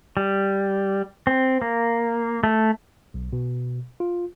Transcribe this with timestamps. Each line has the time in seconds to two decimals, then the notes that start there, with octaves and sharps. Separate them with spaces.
0.17 G3
1.27 C4
1.62 A#3
2.44 A3
3.14 B1
3.33 B2
4.00 F4